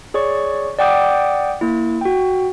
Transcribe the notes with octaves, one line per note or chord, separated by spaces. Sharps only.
G#4 C#5 D5 C#6
D5 F#5 G5 D6 D#6 G6
A#3 E4
F#4 G5